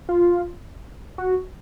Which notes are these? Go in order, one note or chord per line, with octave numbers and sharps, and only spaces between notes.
F4
F#4